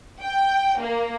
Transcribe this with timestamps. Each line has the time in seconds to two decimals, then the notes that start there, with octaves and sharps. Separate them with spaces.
0.21 G5
0.79 A#3